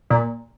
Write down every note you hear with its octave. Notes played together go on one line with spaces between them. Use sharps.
A#2